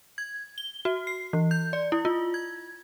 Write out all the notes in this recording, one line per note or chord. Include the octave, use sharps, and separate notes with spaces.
G#6
G7
F#4
C7
E3
G6
D5
E4
F4
G#6